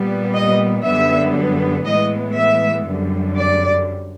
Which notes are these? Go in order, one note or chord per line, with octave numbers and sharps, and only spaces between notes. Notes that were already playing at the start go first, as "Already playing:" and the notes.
Already playing: A#2 G3 B3
D#5
F#2 D3 G3 B3 E5
A2 E3 G#3 B3 D#5
E5
F#2 D3 G3
D5